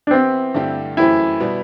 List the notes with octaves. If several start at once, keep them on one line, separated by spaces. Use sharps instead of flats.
D4
E3 B3 C4 E4 G4
G2 D3 A3 E4 G4
F#2 E3 A3 C4 E4 G4
B2 G3 B3